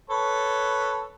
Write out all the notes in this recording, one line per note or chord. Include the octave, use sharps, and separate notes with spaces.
A4 B4 C#5